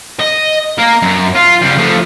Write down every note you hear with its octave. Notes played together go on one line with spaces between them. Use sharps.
D#5
A#3 A#4
F#2
F4
C#3 G3
F3 A3